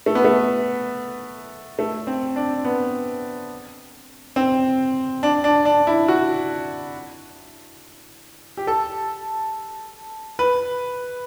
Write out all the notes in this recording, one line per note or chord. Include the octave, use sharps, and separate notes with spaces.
A3
B3
A3
A3
C4
D4
B3
C4
D4
D4
D4
E4
F#4
G4
A4
B4